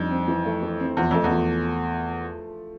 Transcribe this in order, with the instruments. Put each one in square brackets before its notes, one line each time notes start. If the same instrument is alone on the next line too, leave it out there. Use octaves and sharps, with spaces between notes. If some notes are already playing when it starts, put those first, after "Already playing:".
Already playing: [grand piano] F2 [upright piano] D3 G3 D#4
[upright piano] C4
E3
A3
E3
C4
[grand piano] E2 [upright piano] F3
[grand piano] F2 [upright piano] A3
[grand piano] E2
[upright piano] F3